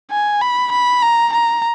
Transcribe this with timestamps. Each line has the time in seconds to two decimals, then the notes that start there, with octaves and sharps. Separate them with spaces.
0.11 G#5
0.42 B5
0.72 B5
1.02 A#5
1.33 A#5